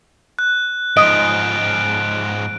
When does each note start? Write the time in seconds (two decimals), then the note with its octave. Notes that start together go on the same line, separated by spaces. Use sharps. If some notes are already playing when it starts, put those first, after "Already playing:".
0.39 F#6
0.97 G#2 F3 D#5 D7